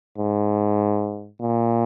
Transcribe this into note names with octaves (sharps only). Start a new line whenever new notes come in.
G#2
A#2